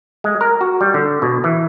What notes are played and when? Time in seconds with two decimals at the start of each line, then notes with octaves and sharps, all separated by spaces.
0.24 G#3
0.41 A#4
0.61 F#4
0.81 G3
0.94 D3
1.22 B2
1.44 E3